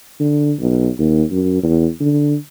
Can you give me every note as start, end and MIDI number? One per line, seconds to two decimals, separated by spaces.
0.20 0.54 50
0.59 0.89 35
0.99 1.23 39
1.31 1.59 42
1.63 1.88 40
2.01 2.35 50